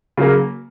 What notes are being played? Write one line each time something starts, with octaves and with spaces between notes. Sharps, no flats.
C#3 F#3 A#3